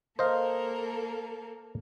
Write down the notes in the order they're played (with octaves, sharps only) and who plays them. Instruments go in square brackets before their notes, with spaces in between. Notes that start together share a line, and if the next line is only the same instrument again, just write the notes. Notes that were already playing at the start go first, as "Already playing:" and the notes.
[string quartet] A#3 A4 A#4 [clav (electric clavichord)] C5 D#5 F5